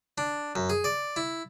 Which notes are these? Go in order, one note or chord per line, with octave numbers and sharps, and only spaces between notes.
D4
F#2
G#4
D5
E4